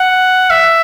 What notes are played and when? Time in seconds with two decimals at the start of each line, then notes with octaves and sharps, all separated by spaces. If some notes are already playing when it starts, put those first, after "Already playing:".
Already playing: F#5
0.50 E5